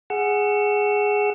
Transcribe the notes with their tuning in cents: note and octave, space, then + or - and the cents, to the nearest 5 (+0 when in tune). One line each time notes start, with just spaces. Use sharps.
G#4 +0 F#5 +0 E6 +35